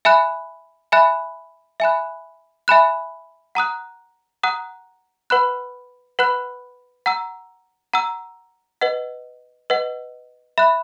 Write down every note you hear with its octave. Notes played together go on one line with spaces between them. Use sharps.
E5 G#5 B5 F#6
E5 G#5 B5 F#6
E5 G#5 B5 F#6
E5 G#5 B5 F#6
F#5 A#5 D#6 F#6
F#5 A#5 D#6 F#6
B4 F#5 B5 F#6
B4 F#5 B5 F#6
F#5 A#5 E6
F#5 A#5 E6
B4 D#5 F#5
B4 D#5 F#5
E5 B5 F#6